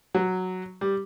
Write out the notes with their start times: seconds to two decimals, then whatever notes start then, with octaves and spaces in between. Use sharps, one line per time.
0.15 F#3
0.81 G3